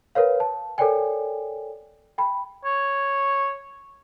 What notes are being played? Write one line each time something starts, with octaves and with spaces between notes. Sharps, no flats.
A#4 B4 C#5 F5
A5
A4 A#4 C#5 D5 G5 G#5
G5 B5
C#5